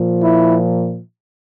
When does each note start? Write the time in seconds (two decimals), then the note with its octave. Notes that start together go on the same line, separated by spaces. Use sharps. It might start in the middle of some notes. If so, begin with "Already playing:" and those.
Already playing: A#2 F3
0.24 E4